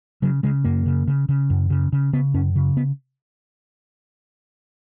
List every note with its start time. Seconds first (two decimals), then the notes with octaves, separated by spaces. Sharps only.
0.22 C#3 F#3
0.43 C#3 G#3
0.64 F#2 A#3
0.86 C#3
1.07 C#3
1.29 C#3
1.50 F#2
1.70 C#3
1.93 C#3
2.13 C#3 B3
2.34 F#2 C#4
2.56 C#3
2.77 B3